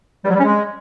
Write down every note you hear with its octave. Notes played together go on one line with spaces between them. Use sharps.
G3
F#3
G3
C#4
G#3